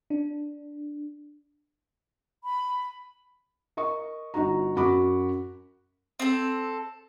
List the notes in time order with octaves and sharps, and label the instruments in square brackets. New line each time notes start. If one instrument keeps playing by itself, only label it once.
[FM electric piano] D4
[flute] B5
[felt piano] A#4 D#5 C#6
G1 D#4 F#4 A#5
F#2 F#4 B5 D6
[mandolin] C4 A4